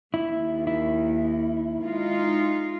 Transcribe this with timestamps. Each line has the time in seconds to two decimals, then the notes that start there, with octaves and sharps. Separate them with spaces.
0.14 D#2 E4
0.67 E4
1.84 G#3 D#4 F4